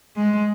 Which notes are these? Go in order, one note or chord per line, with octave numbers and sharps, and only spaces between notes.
G#3